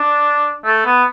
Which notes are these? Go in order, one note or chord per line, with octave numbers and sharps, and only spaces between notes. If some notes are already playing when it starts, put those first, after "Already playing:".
Already playing: D4
A3
B3